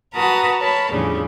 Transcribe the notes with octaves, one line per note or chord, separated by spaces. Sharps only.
F#4 A#4 B4 A5 A#5 D#6
A#4 C#5 A5 B5
E2 A2 C#3 F3 G3 D4